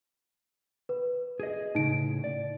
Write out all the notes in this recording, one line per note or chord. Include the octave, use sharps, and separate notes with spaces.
B4
G#4 D#5
A2 C#3 D#4 D7
D5